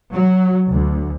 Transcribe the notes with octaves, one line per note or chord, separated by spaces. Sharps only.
F#3
D2